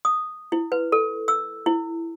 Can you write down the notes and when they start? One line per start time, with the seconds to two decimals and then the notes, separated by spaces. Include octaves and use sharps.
0.05 D#6
0.52 E4
0.72 B4
0.92 A4
1.28 E6
1.66 E4